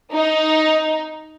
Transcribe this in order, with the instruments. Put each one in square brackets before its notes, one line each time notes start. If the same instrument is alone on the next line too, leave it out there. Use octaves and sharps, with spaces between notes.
[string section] D#4